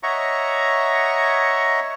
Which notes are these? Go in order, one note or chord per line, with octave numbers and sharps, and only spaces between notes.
C#5 D#5 E5 F#5 A#5 C#6